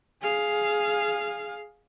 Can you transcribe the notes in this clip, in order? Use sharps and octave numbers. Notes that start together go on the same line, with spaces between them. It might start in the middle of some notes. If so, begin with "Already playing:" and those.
G#4 F5